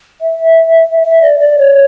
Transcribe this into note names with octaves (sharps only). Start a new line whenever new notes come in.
E5
E5
D5
D5
C#5